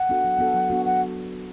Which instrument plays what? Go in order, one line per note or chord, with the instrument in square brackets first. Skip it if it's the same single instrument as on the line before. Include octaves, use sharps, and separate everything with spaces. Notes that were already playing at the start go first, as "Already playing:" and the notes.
Already playing: [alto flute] F#5
[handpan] B3 D4 F#4 A4
F#3
B3 D4 F#4 A4
F#3
B3 D4 F#4 A4
[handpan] F#3 [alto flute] F#5